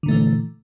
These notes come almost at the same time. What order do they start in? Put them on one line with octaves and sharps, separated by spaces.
D3 A#2 A3 E3